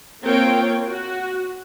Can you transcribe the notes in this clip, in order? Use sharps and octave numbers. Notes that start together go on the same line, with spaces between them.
A#3 C4 F4 A#4 C#5 G5
F#4